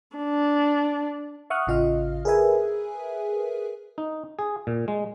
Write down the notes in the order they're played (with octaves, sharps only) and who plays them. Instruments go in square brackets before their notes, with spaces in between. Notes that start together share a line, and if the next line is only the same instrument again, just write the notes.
[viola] D4
[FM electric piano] E5 F#5 C#6 D#6 F6 F#6
A1 C#3 F4 D#5 F5 F6
G#4 A#4 B4 E5 G#5
[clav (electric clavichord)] D#4
G#4
A#2
G#3